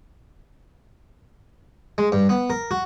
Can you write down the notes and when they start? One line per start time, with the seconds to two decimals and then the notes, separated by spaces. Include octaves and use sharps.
1.98 G#3
2.12 G2
2.29 B3
2.50 A#4
2.71 F#4